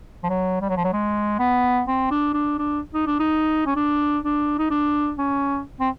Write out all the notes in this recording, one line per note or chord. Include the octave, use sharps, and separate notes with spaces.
F3
F#3
G3
F#3
F3
F#3
G#3
B3
C4
D4
D4
D4
D#4
D4
D#4
C#4
D4
D4
D#4
D4
C#4
C4